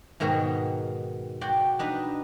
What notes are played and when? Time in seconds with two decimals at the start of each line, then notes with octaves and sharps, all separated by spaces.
0.20 G#2 B2 D#3 F#4 A#5
1.41 F#4 D5 G5
1.79 D4 D#4 B4